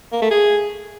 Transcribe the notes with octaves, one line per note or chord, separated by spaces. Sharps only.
A#3
A3
G#4